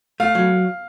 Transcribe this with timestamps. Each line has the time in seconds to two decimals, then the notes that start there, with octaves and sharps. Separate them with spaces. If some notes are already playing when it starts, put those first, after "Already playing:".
0.20 A3 F5
0.35 F#3